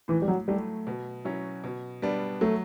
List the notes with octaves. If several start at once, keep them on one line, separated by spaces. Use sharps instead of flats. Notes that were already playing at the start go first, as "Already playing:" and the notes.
A2 E3
G3
F#3
F#3 G3 A3 E4
B2
F#3 C#4 E4
B2
G3 B3 D4
F#3 A3